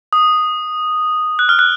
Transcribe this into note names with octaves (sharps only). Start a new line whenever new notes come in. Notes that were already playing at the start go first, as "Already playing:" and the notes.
D#6
F#6
F6
F#6